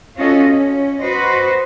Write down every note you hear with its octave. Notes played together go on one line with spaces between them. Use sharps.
C#4 F4 F#4 A4 D#5
C#4
F#4 B4 C5 D#5